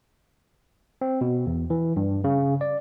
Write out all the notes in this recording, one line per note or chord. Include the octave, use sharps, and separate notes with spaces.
C4
B2
E2
E3
G2
C#3
D5